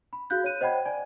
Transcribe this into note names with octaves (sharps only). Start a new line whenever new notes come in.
B5
F#4 G#4 F5 F#6 G6
C#5 F#6 D#7
C5 D#5 F#5 G5 B5 G#6
D5 G#5 G#6